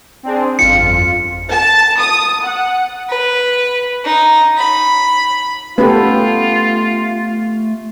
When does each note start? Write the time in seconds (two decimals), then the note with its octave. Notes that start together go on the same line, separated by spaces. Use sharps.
0.23 C4 D4 G#4
0.59 G1 F2 F4 C#7
1.51 A5
2.00 D#6
2.44 F#5
3.09 B4
4.04 D#4
4.57 B5
5.78 A3 B3 C#4 F4 G4 A4 B4